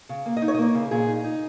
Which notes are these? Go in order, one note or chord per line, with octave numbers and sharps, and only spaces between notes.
C#3
A#3
D#5
D#4
C#5
D#5
A#3 C#5
C#3
A#2 G#4
D#4
D#4